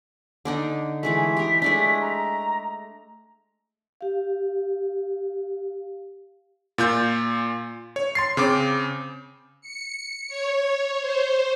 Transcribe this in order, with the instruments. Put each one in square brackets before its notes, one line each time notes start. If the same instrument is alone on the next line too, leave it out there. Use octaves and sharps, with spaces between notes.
[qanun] D3 D4 D#4
[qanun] E3 G#3 A3 [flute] B6
[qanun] G4 A#4
G#3 A3 D4
[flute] A#5
[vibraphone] G4 F5
[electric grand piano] A#2 F4 G6
C#5
C6 A6 C7
C#3 C4 D6
[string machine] C#7
C#5
C5